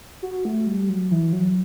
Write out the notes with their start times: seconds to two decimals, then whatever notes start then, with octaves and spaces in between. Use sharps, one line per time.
0.22 F#4
0.45 A3
0.67 G3
0.89 F#3
1.11 E3
1.33 F#3